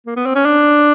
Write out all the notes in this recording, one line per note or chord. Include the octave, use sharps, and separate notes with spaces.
A#3
B3
C4
C#4
D4